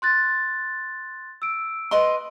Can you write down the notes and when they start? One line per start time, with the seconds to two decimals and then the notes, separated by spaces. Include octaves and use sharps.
0.02 C6 F#6 A6
1.42 E6 D7
1.91 B4 D#5 C6